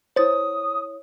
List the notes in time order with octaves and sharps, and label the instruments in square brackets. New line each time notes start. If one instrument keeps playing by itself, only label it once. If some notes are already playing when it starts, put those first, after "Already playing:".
[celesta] E4 C#5 [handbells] C5 A6 [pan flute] D#6